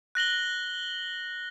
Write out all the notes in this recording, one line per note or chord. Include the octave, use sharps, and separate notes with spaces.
F#6 A#6 F#7 G7